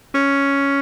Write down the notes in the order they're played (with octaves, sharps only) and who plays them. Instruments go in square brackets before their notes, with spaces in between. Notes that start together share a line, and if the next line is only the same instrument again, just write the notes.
[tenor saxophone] C#4